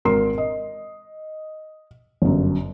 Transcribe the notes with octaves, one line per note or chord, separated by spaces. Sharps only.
G#1 A#4 C6 C7
D#5
G1 F#2